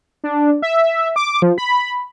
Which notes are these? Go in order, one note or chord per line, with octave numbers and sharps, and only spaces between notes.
D4
E5
D6
F3
B5